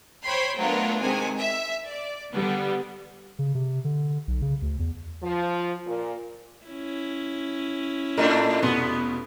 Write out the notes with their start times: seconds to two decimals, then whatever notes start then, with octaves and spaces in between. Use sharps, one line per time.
0.24 C5 C#5 G5 B5 C6
0.59 F#3 A3 B3 D4 F4 A#4
1.01 C3 D#3 G#3 G#5
1.39 E5
1.87 D5
2.33 D3 G3 B3
3.39 C#3
3.55 C3
3.84 D3
4.28 B1
4.42 C#3
4.62 D2
4.79 E2
5.22 F3
5.86 A#2
6.66 C#4 E4
8.18 A2 A3 D4 A#4
8.62 F1 B2 B3 C6